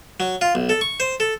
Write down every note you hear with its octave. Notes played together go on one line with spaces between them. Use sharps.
F#3
F4
B1
A4
C#6
C5
A4